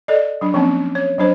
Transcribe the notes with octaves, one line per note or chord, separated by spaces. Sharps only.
A4 D5 D#5
F#3 D4
F3 A#3 C4 C#4
C#5
F#3 D4 C5